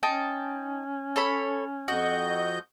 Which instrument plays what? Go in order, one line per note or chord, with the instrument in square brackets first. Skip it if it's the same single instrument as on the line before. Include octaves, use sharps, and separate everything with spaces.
[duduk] C#4 [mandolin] D#4 G5 A5
[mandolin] A4 C#5 B5
[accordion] F2 D#5 G6 [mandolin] F#4